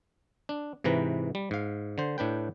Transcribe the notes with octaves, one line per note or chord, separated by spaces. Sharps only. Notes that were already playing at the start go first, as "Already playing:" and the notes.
D4
G#2 C3 E3 B4 A#5
G3
G#2 F5
D3 C5
A2 D4 B4 G5